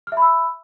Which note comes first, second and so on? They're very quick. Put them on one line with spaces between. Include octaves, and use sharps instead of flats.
F6 E5 B5 E6